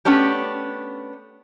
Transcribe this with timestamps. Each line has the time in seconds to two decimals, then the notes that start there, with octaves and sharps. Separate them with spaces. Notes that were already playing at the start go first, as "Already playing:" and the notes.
0.05 A3 B3 C#4 D4 G4